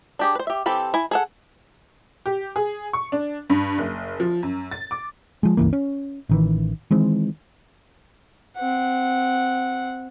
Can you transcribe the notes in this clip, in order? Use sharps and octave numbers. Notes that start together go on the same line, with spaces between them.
D4 G4 G#4
B4 C5
G4 E5
E3 C4 G4 A4 B5
E4 G#5
G#4 A4 F#5
G4
G#4
C#6
D4
G2
F#1
F3
F#2
A6
D6
F3 G#3
G1 C#2 E3 A#3
C#4
A1 D#3 E3
D#3 E3 G#3 C4
C4 F#5